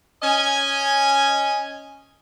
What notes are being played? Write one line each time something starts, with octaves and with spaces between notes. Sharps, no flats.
C#4 D#5 G#5